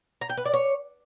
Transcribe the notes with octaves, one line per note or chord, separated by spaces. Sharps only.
A#5
G5
B4
D5
C#5